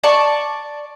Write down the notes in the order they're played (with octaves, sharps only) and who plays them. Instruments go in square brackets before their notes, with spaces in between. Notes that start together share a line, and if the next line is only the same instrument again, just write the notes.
[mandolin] D5 A5 C#6